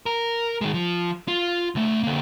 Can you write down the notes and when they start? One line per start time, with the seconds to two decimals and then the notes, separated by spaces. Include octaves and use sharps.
0.06 A#4
0.61 D#3 G#3
0.74 F3
1.28 F4
1.75 C#2 A3
2.03 D3 A#3